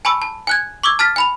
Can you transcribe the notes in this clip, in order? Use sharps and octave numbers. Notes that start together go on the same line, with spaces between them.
G#5 A5 B5 C#6 E6
A5
G#5 F#6 G#6
C#6 D6 E6 G#6
A5 F6 A6 B6
G#5 B5 F7